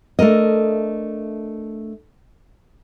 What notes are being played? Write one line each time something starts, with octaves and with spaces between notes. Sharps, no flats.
A3 D4 A#4 D#5